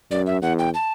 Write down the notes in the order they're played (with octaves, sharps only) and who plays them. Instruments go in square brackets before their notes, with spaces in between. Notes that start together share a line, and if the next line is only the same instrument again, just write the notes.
[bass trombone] F#2 [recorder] D5
[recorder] E5
[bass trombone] E2 [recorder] F#5
[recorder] G5
A5